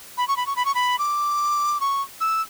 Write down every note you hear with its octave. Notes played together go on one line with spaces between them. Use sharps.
B5
C#6
B5
C#6
B5
C#6
B5
D6
C#6
E6